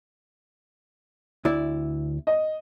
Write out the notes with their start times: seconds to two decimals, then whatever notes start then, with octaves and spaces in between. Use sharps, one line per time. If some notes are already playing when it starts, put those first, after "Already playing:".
1.45 D2 E4 D5
2.27 D#5